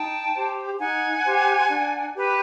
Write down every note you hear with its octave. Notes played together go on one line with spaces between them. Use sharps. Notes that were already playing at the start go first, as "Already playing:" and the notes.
Already playing: D#4 G5 A5
G4 C5
D#4 F#5 G#5
G4 C5
D4
G4 B4